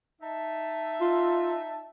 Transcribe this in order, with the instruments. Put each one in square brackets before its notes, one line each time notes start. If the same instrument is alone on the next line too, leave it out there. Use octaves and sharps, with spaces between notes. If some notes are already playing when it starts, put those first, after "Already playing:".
[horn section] D#4 E5 A5
[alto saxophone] F4